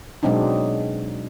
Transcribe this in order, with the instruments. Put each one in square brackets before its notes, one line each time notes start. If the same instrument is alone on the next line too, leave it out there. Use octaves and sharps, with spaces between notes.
[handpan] B2 F#3 G#3 C4 D4 D#4